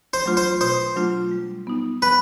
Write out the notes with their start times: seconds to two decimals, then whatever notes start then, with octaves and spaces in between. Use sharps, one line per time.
0.13 C5
0.26 F#3 A3 D4 F4
0.37 C5
0.61 B2 C5
0.96 F#3 A3 D4 F4
1.31 G3
1.67 B3 D#4
2.02 G3 B4